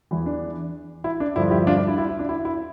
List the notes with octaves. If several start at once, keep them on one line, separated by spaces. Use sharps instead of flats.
E2 E3 E4
D4
E4
D4
G2 D3 F3 E4
E4 G4
D4 F4
D4
E4
E4
E4
D4
E4
E4